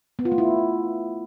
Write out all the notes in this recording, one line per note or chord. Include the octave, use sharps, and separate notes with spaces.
B3
F4
A3
E4